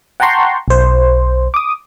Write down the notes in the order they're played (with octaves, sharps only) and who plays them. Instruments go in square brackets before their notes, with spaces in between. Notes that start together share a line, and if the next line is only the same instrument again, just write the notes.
[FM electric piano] F#5 G5 A5 A#5 C6 C#6
B1 C5
D6 D#6